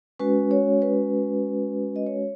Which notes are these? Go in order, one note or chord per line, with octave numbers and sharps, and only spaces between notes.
G#3 C#4 F#4 B4
C#5
B4
D#5
C#5